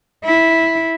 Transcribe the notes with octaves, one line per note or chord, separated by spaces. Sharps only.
E4